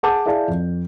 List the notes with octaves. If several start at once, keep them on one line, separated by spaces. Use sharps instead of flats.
G#4 F#5 A5 D6 G6
E4 G#4 D5 F5 A5
F2